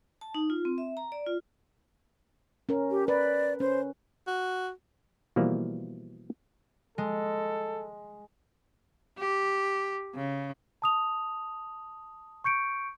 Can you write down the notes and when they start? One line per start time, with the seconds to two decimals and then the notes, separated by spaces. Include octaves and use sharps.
0.21 A5
0.35 D#4
0.50 F4
0.65 C4
0.78 E5
0.97 A#5
1.12 D5
1.26 F4
2.69 C#4 A#4
2.91 G4
3.08 B4 D5
3.60 C#4 C5
4.27 F#4
5.36 B2 E3 F3 G3 A#3
6.98 G#3 A4
9.19 G4
10.15 C#3
10.82 A5 D#6 F7
12.44 C#6 G6 C#7 D7